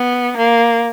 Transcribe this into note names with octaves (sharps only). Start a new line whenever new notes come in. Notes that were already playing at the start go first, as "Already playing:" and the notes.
Already playing: B3
A#3